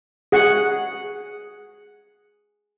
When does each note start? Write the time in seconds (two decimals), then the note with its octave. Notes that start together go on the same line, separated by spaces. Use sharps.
0.32 G#4 F#5